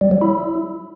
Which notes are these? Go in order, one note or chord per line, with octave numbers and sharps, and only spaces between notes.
G3
F#3
E4